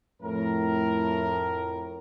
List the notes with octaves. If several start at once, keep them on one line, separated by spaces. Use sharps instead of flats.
F2 A2 A#4